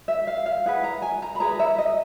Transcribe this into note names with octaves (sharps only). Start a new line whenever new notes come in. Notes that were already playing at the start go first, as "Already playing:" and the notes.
E5
F5
F5
E4 G#4 B4 F#5
A#5
G#5
A#5
B5
E4 G#4 B4 A#5
E5
D#5